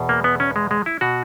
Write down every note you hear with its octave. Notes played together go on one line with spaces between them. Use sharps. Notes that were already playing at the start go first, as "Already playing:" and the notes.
Already playing: E2 B2
A#3
B3
C#4
G#3
G#3
E4
B2 F#4